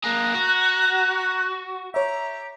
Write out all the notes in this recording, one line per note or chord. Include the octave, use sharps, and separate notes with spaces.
A#3 G#4 A#5 F#6
F#4
G4 C#5 E5 A#5